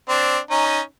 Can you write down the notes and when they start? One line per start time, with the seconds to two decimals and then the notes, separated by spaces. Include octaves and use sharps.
0.09 C4 D4
0.51 C#4 D#4